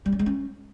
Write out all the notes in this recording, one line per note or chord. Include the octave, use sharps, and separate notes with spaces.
G3
C#4
G#3
C#4